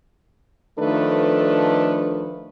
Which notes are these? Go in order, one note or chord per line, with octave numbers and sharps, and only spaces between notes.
D#3 F3 A3 D4 A4 B4